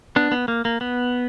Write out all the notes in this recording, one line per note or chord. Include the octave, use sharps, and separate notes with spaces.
B3 D4
B3
A#3
A#3
B3